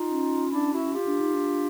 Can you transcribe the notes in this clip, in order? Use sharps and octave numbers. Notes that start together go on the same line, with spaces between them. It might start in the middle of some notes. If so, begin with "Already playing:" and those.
Already playing: D#4 F4
C#4
D4 E4
E4 F#4
F4 G4
D4
D#4
D4